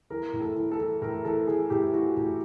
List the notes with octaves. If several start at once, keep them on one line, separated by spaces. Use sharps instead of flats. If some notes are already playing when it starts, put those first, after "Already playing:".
E3 A#4
A2
A4
E3
A4
E3
A2 A#4
E3 A4
E3 G#4
A2 G4
E3 F#4
A2